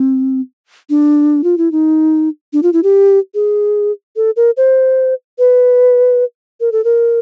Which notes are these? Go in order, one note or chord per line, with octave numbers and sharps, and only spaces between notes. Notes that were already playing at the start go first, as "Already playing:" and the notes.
Already playing: C4
D4
F4
E4
D#4
D4
F4
E4
G4
G#4
A4
A#4
C5
B4
A#4
A4
A#4